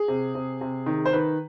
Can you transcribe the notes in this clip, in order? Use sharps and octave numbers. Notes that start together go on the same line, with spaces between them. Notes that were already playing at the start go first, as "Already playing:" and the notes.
Already playing: G#4
C3
C3
C3
D#3
C5
D#3 B4